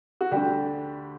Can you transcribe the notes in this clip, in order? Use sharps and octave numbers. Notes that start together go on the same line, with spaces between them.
F#4
D2 D3 G3 G4